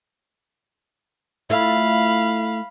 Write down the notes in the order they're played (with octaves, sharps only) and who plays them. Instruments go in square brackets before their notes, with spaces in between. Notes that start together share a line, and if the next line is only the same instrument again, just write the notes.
[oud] A3 E4 F4 [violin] F5 B5